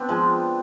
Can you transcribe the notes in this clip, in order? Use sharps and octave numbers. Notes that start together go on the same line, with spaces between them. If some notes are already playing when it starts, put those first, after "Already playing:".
Already playing: B3 C4 D4
F3 G#3